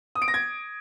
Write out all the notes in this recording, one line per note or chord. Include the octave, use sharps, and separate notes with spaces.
D#6
D7
A#6
G#6